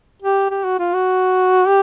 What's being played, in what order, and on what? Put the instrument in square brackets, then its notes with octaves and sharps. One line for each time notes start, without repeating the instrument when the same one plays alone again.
[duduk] G4
G4
F#4
F4
F#4
G4